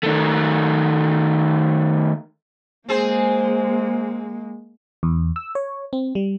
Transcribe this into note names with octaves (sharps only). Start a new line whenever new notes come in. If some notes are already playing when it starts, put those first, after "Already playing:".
D#3 A3
G#3 A#3 C4 G#4 C5
E2
E6
C#5
C4
G3